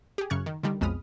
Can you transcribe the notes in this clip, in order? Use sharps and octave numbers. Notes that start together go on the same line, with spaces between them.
G4 G#4
F#2 C#3 C#6 F6 F#6 G#6
D#3
D3 D#3 G3
B1 F2 G#3 B5 D#6 F6